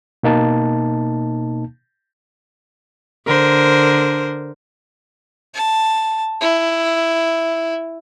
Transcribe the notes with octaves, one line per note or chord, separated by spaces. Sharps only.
B2 A#3 D#4 A5
D3 A#4 C5
A5
E4